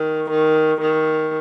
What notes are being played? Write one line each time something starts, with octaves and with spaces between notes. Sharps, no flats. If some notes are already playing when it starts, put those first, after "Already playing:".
Already playing: D#3
D#3
D#3